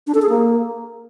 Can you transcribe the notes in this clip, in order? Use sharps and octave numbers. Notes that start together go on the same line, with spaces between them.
D4
A4
G#4
A#3